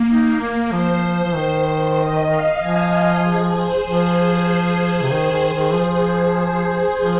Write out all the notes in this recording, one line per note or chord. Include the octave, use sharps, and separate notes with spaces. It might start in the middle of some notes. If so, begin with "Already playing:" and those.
Already playing: A#3
D#4
A#3
F3 C5
F3
D#3
D#5
F5
F3 G#5
G#4
C5
F3 G#4
C3
D#3
D#3
D#3
F3
F3